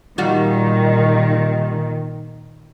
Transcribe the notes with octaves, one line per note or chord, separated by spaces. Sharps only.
A#2 D#3 G3 F4 F#4